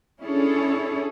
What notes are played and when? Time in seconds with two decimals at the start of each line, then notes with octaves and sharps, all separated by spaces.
0.20 C#4 D4 E4 G#4 A4 C#5